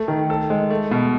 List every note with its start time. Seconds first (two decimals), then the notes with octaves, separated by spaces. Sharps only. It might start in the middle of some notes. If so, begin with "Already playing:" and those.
Already playing: A3
0.08 D#3
0.30 A4
0.50 G#3
0.70 A3
0.91 B2